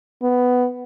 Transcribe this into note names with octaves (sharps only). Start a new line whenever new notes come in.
B3